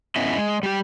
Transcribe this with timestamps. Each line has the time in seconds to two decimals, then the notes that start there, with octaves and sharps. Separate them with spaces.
0.16 B3 C#4 E4 D#5 E5
0.38 G#3
0.63 G3 G4